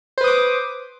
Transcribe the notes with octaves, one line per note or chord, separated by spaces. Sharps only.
B4 C5 D6 D#6